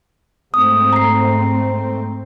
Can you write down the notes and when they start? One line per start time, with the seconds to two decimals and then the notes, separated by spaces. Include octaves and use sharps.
0.54 G#2 A3 C4 D#6
0.93 A#5 C7